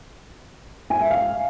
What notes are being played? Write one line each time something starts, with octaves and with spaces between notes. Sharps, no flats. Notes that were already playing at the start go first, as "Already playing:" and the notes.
G#5
E5
F5